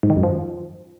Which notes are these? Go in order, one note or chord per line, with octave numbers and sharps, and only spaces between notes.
G#2
D#3
F#2
F3